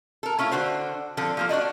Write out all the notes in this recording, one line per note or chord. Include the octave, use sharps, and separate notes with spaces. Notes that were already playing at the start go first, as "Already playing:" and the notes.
A4 A#4
A3 C#4 E4 F4
D3 D4 F#4 C5
D3 F3 C4 A4
F3 A#3 F4
D4 F#4 D5 D#5